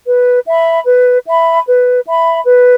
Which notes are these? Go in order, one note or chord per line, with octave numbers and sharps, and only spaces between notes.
B4
E5 B5
B4
E5 B5
B4
E5 B5
B4